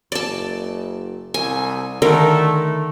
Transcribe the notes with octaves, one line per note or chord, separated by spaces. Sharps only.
F#1 D5 A5
C2 G#5
D3 D#3 A3 A#4